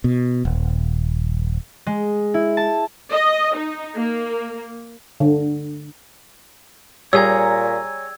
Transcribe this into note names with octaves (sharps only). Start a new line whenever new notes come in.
B2
D#1
G#3
E4
A5
D#5
D#4
A#3
D3
A#2 G3 G#4 C#5 G#5 A#5 E6 G#6